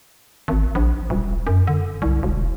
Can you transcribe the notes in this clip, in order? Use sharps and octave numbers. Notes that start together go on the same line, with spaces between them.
G#1
A#1
D#1
F#2
D3
C2
E1